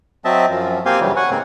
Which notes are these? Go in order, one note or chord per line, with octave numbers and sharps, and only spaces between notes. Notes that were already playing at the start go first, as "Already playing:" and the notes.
F#3 C4 D#5 E5 A5
F#2 F3
A#3 C4 G4 F5 G#5 C6
G2 C#3 E3 F#3 G3
C#5 F#5 G#5
G#2 C#3 A#3 C4